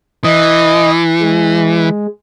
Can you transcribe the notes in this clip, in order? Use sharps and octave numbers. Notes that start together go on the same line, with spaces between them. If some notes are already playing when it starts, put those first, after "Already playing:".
E3 D#5
G#3